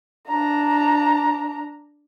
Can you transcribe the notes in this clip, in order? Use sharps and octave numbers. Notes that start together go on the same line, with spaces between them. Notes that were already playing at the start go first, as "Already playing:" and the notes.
D4 A#5